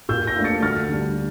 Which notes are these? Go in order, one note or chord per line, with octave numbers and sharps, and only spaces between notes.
A#2 E6 G6
G6 A#6
A3 D4 F4
A6 C#7
D2 F6 A6
D3 G3 D4